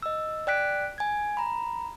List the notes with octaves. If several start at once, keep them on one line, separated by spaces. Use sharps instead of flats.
D#5 E6
D5 G5 F#6 B6 D7
G#5 G#6
A#5 B5